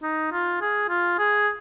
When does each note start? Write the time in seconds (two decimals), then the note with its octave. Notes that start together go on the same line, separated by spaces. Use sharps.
0.03 D#4
0.32 F4
0.62 G#4
0.89 F4
1.19 G#4